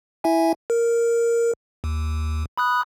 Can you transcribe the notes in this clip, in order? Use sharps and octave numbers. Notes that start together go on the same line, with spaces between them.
E4 E5 G#5
A#4
D#2
B5 D#6 F#6